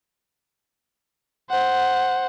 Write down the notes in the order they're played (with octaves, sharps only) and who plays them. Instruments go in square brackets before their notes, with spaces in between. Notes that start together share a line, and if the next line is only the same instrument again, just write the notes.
[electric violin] C5 F#5